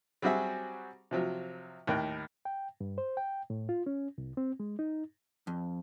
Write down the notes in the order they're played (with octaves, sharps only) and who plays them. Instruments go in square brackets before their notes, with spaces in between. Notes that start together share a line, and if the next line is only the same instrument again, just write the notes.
[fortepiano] F#3 G3 C4 F#4 G#4 E5
C3 F3 F#3
D#2 A2 A#4 G5 F#6
[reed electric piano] G5
G2
C5
G5
A2
F4
C#4
C2
C4
G#3
D#4
[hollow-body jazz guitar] F2